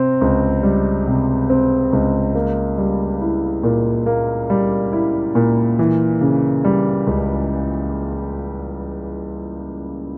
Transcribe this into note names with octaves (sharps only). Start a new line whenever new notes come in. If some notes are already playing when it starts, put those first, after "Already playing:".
Already playing: C3 C4
C#2
G3
C3
C4
C#2
A#3
G3
E4
A#2
A#3
G3
E4
A#2
E3
C#3
G3
C#2